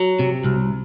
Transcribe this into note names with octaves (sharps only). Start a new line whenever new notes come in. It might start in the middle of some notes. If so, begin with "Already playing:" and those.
Already playing: F#3
C3
C2